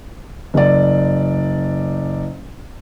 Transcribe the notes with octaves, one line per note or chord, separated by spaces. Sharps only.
F#1 D5